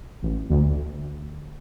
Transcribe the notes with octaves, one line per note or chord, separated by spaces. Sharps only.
A1
D2